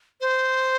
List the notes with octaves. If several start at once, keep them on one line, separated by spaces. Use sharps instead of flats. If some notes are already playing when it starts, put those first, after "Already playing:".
C5